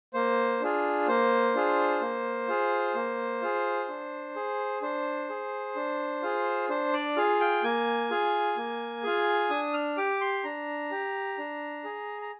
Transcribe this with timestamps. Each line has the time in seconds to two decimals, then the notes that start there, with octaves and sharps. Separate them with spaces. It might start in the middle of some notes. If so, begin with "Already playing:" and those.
0.13 A#3 C5
0.61 D4 F4 G#4
1.08 A#3 C5
1.55 D4 F4 G#4
2.01 A#3
2.48 F4 G#4
2.95 A#3
3.42 F4 G#4
3.89 D4
4.36 G#4
4.82 D4 C5
5.29 G#4
5.76 D4
6.22 F4 G#4
6.69 D4 C5
6.93 D5
7.16 F4 G#4 F5
7.40 G5
7.63 A#3 G#5
8.10 F4 G#4
8.57 A#3
9.03 F4 G#4
9.50 D4 D#6
9.74 F6
9.97 G4 D6
10.21 C6
10.44 D4 A#5
10.91 G4
11.38 D4
11.84 G#4
12.22 A#5